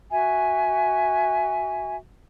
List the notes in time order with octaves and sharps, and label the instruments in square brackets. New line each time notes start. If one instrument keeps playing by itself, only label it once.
[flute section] F#4 E5 G#5